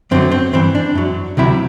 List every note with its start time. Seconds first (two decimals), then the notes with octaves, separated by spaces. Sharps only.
0.11 F#2 D3 F#3 C4
0.31 C4
0.53 G2 E3 C4
0.75 D4
0.95 F#2 F#3
1.37 D2 C3 F#3 E4